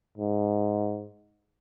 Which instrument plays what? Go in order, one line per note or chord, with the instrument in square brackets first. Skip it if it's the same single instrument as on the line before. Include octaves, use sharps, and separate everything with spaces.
[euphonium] G#2